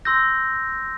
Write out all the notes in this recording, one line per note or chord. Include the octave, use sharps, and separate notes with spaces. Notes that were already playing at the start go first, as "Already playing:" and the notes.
C6 E6 G6 A#6